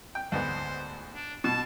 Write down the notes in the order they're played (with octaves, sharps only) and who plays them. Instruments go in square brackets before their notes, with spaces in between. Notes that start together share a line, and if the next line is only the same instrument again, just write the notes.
[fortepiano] G5
[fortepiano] D2 G#2 B3 [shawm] C5
[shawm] D4
[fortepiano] B2 [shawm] A5